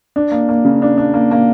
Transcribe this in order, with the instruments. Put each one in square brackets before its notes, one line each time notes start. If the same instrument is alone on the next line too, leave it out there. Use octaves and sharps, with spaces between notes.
[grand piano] D4
A#3
A#3
C#3
D4
D4
A#3
A#3